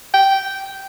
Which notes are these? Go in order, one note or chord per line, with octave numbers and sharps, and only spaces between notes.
G5